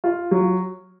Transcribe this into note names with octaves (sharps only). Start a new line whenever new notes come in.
F4
F#3